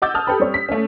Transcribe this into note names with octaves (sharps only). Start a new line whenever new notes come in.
D#5 F#5 D6 E6 G6 A6
A5 D#6 F6 A6
G4 A4 B4 G5 B5
G3 C4 C#5
B6
A3 C#4